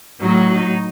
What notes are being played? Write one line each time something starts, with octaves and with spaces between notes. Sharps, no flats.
A2 F#3 D#4
D#4